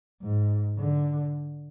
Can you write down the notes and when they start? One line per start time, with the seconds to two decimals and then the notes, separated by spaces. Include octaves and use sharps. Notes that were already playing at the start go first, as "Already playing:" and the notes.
0.22 G#2
0.78 D3